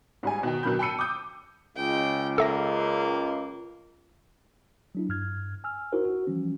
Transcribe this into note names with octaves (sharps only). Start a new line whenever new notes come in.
G#2 G3 G#5
B2 D#3 G5
B2 D3 F#3 A#4 B5 G6
G5 A5 B5 E6 C#7 D#7
D6 D#6 G6
C#2 G5
A#3 A4 E5 A#6
F#3 D4 E4
G2 F6 G#6
G#5 E6 F6
D#4 E4 F#4 A#4 C5
F#4
E3 F3 G3 C#4